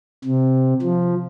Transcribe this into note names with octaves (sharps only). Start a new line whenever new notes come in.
C3
F3